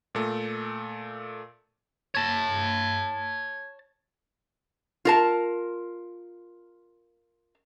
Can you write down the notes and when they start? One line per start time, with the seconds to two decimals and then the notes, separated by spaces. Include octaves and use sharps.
0.15 A#2 A3
2.15 C#5 A5
5.05 F4 A#4 A5